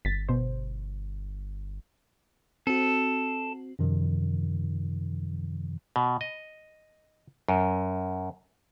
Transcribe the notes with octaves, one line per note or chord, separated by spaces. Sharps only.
G1 A6 B6
B2 C5
C4 F#4 A4
F#2 C3 D#3 F3
B2
D#5
F#2